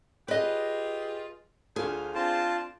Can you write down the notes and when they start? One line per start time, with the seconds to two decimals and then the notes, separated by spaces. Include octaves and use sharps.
0.28 F4 G4 G#4 B4 D#5
1.76 D2 F4 G#4
2.15 C4 D4 F4 A5